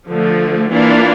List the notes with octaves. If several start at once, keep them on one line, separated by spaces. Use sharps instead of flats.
D3 F3 A3
E3 A#3 D4 F4